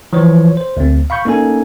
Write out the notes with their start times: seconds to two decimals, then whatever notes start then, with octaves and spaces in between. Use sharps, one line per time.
0.13 E3 F3 C5 C#5
0.57 C5
0.77 D2 C4
1.10 F5 B5 C#6 G6
1.25 A#3 C#4 D#4 A4 G#5